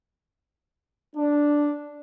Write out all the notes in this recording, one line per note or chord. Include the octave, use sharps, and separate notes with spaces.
D4